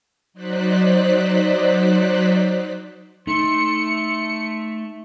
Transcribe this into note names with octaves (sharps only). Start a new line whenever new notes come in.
F#3 D#4 C5 D5 F#6 B6
A3 D#4 C6 C#7